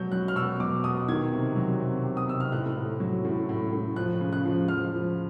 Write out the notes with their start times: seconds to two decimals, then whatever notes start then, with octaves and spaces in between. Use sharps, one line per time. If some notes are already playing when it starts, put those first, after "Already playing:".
Already playing: B2 F#3 G6
0.12 F#3 F#6
0.28 F6
0.36 B2 E6
0.60 F#3 D6
0.84 B2 D#6
1.08 D#3 G#6
1.32 C3
1.56 F#3
1.80 C3
2.04 C3
2.17 D#6
2.28 C3 E6
2.40 F6
2.52 A2 F#6
2.77 A2
3.00 F#3
3.24 A2
3.49 A2
3.73 A2
3.96 F3 F#6
4.21 C#3
4.33 F#6
4.45 F3
4.68 F3 F6
4.92 F3